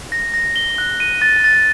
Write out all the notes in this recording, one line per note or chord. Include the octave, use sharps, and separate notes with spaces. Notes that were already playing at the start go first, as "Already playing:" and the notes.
A#6
A#6
G7
F#6
D#7
A6
A6